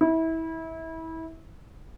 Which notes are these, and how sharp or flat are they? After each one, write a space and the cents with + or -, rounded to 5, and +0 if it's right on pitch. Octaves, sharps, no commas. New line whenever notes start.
E4 -25